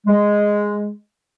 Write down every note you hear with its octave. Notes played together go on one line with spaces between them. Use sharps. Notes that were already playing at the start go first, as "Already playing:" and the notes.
G#3